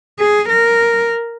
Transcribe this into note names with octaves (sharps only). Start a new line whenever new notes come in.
G#4
A#4